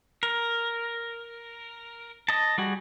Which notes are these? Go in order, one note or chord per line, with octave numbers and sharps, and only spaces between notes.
A#4
D#5 A5
G3 F#4 G#4